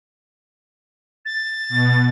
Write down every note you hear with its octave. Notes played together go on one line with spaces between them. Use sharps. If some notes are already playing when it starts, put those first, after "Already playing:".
A6
B2